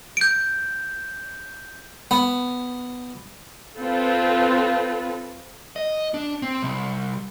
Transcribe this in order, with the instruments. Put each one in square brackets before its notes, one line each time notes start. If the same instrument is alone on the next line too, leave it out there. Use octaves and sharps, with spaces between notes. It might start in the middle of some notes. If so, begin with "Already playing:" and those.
[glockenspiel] G6 D7
[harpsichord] B3
[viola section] C4 F4 A4 B4
[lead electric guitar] D#5
D4
C4
C2